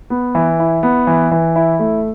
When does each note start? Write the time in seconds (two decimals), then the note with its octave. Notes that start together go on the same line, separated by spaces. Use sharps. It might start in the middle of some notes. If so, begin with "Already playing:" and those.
0.10 B3
0.35 E3
0.60 E4
0.83 B3
1.07 E3
1.31 E3
1.56 E4
1.79 A3